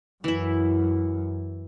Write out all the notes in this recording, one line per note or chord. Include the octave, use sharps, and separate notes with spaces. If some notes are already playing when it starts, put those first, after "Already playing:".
F#2 E3 E4